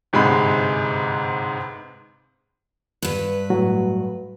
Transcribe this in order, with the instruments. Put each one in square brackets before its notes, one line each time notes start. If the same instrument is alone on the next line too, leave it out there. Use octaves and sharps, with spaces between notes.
[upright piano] G1 G#2 C3 G#3 B5
[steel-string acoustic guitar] G2 B4
[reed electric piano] A2 F#3 F#4